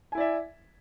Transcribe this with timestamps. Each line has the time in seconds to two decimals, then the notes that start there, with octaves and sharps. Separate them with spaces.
0.12 G#5
0.15 E4
0.18 D5
0.20 E5